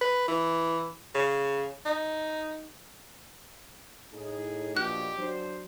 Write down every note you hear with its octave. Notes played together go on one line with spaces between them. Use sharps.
B4
E3
C#3
D#4
A2 D#4 G#4
A#1 B2 G4 F#6
F#3 D4 C5